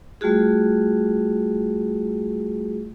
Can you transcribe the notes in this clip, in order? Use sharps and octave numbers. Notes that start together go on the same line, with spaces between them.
G3 A3 F4 F#4 G#4